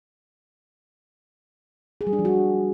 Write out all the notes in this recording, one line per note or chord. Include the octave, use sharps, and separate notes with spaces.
G#4
G3
D4
F3
F#4